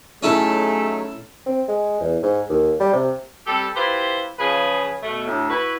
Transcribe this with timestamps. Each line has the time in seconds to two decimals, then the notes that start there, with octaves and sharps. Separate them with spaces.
0.23 F#3 A3 C#4 D#4 E4 G#4 A4
1.46 C4
1.68 G#3
2.01 E2
2.23 G#2
2.49 D#2
2.80 G3
2.93 C3
3.46 G3 C4 G4 A4
3.76 E4 F4 G4 B4 C5
4.38 C#3 F3 G#4 B4
5.03 B2 A3
5.26 D2 A2
5.50 E4 F#4 B4